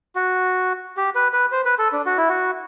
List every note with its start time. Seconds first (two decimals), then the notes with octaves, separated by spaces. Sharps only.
0.16 F#4
0.97 G4
1.15 B4
1.33 B4
1.52 C5
1.65 B4
1.79 A4
1.93 D4
2.06 F#4
2.17 E4
2.29 F#4